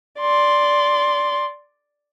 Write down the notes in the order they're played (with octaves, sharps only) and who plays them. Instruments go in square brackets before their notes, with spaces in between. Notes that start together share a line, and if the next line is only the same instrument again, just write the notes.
[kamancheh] D5 C6